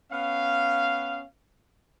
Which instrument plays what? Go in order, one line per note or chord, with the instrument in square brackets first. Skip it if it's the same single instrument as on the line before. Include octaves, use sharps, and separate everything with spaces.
[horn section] B3 C#4 F5